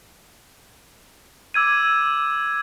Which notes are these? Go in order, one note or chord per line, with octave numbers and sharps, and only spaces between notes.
D6 E6 G#6 D#7